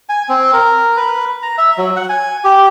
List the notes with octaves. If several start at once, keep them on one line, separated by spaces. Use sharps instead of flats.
G#5
C4
A#4
B4
A#5
E5
F#3
F#5
G#5
G4